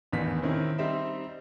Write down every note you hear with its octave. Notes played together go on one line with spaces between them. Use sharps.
A1 E2 D#3 D4 B6
C3 D#3 C4 C#4 E4
G3 C4 D#4 C5 E5